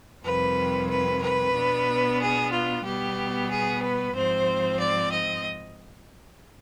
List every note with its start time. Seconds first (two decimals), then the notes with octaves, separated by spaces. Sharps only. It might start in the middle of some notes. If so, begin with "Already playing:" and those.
0.24 F2 C3 D#3 G3 B4
0.89 B4
1.22 B4
1.54 B2 B3 D4
2.19 G#4
2.51 F4
2.84 B2 G3 B3 G4
3.50 G#4
3.82 B4
4.14 G#2 F3 C4 C5
4.79 D5
5.12 D#5